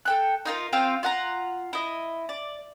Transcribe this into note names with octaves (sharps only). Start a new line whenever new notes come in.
A4 G5 F#6
D#4 F4 A#4
C4 F4 F5 G5
F4 F#5 A#5
E4 D#5
D5